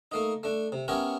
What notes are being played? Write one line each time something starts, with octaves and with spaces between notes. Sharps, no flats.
A3 A#3 D#4
A3 D4
C3
B3 C#4 G4 A#4 C#5 E5